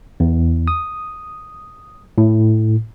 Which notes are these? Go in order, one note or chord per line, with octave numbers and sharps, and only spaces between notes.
E2
D#6
A2